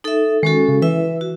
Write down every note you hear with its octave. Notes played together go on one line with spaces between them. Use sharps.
D#4 A4 E5
D#3 G#3 C#4 F#4 A4
C#3
E3 E4 B4 E5
F#4